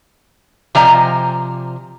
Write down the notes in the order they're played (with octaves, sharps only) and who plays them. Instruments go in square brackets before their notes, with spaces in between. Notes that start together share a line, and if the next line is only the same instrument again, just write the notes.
[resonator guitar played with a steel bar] C3 F3 D5 D#5 G#5 A#5